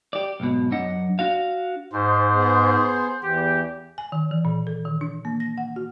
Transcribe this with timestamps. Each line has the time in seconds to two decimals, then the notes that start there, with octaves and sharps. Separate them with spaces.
0.13 G4 D5
0.40 B1 G#2 B2
0.71 F#2 F#3 D4 D#5 F#5
1.19 D4 F#4 F5
1.93 G#2 C5
2.34 B3 G#4
3.22 E2 E3 G4
3.98 G#5
4.12 D#3
4.31 E3
4.45 A#2
4.67 A4
4.85 D#3
5.01 D4
5.25 A#3
5.40 A#6
5.58 F#5
5.76 F#4